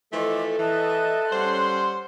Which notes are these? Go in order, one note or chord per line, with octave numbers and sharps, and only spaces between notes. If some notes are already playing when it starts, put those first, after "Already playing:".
E3 F3 A3 A4 D#5 C6 D6
E3 D#5 E5 A5 F#6
G3 C#4 C5 F#5 C6